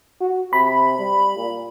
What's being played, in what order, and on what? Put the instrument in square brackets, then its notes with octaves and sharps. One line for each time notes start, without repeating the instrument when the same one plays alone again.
[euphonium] F#4
[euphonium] C3 [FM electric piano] B5
[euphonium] G3
A#2